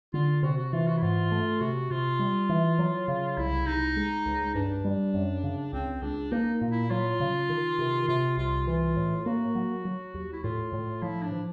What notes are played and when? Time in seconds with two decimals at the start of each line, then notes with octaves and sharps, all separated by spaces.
0.14 D3 F4
0.43 C3 F#4
0.58 F#4
0.73 E3 F4
0.87 F#4
0.97 E4
1.02 G#2 F4
1.31 A3
1.61 C3 F#4
1.90 C3 F4
2.19 G3
2.49 E3
2.79 F#3
3.08 C#3
3.37 C2 E4
3.67 C2 D#4
3.96 G#3
4.26 C#2
4.55 G2 D4
4.84 G3
5.14 F#2
5.44 C#3
5.73 C#2 C4
6.02 C#2 D4
6.32 A#3 D#4
6.61 A#2
6.71 E4
6.90 F#3 F4
7.20 C#3
7.49 D#3
7.79 C3
8.08 C3 F4
8.37 C2 F4
8.67 E3 F4
8.96 A2
9.26 A#3 F#4
9.55 F#3
9.85 F#3
10.14 D#2
10.33 E4
10.44 A2 F4
10.73 A2
11.02 F3 E4
11.22 D4
11.32 F3